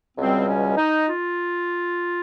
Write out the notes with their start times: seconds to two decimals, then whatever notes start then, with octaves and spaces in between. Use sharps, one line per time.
0.17 C#2 B2 G3 C4
0.47 C#4
0.77 D#4
1.07 F4